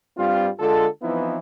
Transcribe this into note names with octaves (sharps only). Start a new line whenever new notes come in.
G2 G3 C4 F4
D3 G#3 F4 A4
E3 F3 B3 C4 D#4 E4